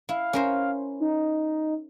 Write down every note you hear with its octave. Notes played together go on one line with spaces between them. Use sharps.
E4 F5
C#4 A#4 C5
D#4